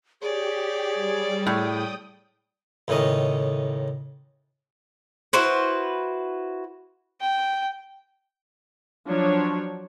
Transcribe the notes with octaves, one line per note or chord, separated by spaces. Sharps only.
G4 G#4 C#5 D5
G3
A2 G5 D#6
C#2 A2 D#3 C#4 D#5
E4 F#4 B4 C5
G5
F3 F#3 D4 C#5